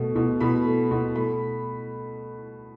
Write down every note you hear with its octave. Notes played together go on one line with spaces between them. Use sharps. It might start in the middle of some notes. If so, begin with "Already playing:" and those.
Already playing: B2 A3
B2
B2 B5
A3
B2
A3 B5